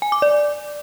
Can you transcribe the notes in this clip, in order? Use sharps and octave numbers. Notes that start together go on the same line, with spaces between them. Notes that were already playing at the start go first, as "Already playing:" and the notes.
G#5
D6
D5